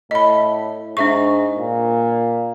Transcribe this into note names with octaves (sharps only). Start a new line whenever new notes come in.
A2 D#5 B5
G#2 D4 E5 C#6
A#2